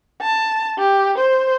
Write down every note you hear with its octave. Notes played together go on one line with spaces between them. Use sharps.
A5
G4
C5